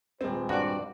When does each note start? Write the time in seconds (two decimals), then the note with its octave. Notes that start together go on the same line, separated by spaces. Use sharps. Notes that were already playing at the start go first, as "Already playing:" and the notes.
0.21 D#1 G#3 C4 B4 C5
0.49 G2 F#4 D5